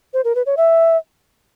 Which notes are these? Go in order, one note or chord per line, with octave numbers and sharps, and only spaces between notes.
C5
A#4
B4
C#5
E5